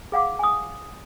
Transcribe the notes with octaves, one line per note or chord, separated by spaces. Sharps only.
G#4 F5 F#5 D6
G#5 D#6